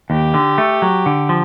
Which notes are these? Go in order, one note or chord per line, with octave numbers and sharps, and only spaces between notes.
D#2 G4
D3
A3
F#3
D3
F3